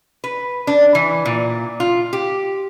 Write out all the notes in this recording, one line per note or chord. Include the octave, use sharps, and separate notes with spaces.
B4
D4
E3
A#2
F4
G4